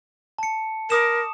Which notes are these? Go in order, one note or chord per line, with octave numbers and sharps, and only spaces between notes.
A5 C#7
A#4 D6 D#6 E7